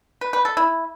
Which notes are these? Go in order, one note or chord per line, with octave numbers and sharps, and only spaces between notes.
B4
B4
A4
E4